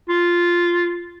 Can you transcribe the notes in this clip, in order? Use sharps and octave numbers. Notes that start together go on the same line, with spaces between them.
F4